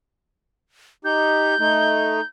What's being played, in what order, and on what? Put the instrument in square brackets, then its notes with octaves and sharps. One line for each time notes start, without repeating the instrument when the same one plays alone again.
[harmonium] D#4 G4 [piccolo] G6
[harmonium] A3 D#4